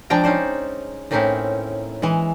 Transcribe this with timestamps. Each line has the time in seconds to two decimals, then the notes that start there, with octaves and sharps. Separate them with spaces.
0.10 F3 G#3 D4 G5 A#5
0.24 C#4 D#4 C5 D5
1.11 A2 A#3 C4 C#4 D#4 E4
2.02 E3 G#3